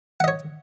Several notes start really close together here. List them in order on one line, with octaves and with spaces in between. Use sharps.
F#5 D#5 C#5